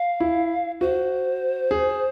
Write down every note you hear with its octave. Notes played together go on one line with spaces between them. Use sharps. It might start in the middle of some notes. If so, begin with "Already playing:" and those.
Already playing: F5
E4
F#4 C5
G#4